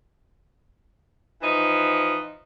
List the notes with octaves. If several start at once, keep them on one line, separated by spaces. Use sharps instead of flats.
E3 F3 D#4